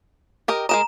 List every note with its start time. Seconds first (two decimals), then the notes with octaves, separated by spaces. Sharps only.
0.48 G4 A#4 D#5
0.69 G#3 A#4 D#5 A#5 E7